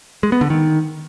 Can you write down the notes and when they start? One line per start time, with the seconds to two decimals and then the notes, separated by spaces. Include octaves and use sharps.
0.23 G#3
0.32 B3
0.41 D3
0.50 D#3